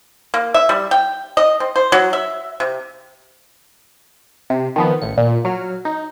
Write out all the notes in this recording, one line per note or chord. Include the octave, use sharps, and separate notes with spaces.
A#3
E5
G3
G5
D#5
C4
C5
F#3
E5
C3
C3
D#3 F3 B3
A1 C#7
A#2
F#3 F6
D#4